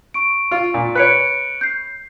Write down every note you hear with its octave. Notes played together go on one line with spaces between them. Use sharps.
C#6 D7
F4
A#2
B4 C#5 F#6 C#7 D7
G6 C7